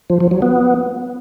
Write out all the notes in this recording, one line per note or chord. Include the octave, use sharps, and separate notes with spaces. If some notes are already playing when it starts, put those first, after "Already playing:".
F3
F3
F#3
B3